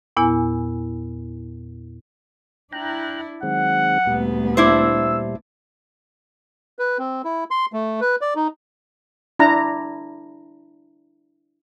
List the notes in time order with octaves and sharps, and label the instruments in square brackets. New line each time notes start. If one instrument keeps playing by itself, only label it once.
[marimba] E2 A#2 B3 E4 G#5
[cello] D4 E4 [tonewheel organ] G5 A#5 F#6
[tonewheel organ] D#3 G#3 C4 [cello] F#3 [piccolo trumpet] F#5
[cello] D2 B3 [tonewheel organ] A#2 G3
[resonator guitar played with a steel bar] D4 E4 C5 [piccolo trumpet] E6
[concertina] B4
C4
E4
C6
A3
B4
D5
D#4
[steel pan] D4 E4 A#5